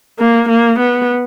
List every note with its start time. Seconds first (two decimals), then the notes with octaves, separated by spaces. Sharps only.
0.19 A#3
0.49 A#3
0.79 B3